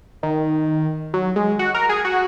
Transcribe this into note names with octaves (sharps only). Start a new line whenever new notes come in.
D#3
F#3
G#3
F#4
A#4
G#4
F#4